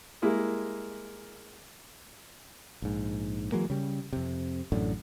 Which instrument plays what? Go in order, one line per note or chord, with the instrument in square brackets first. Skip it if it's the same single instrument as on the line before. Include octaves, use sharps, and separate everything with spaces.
[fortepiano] G3 G#3 A#3 E4
[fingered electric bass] A#1 G#2
E3 F#3 G#3 A#3
C#3 G3
F2 C3
A1 F#2 A2 D3